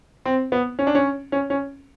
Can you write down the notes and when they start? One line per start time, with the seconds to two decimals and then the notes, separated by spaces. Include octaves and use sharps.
0.25 C4
0.52 B3
0.79 C#4
0.87 D4
0.95 C#4
1.32 C#4
1.50 C#4